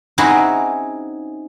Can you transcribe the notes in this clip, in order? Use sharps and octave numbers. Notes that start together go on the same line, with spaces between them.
C4 C#4 D#4 E4 F#4 G#4